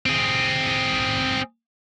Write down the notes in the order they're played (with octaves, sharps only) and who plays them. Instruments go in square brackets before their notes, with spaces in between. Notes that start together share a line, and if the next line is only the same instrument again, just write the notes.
[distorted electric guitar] C4 G#4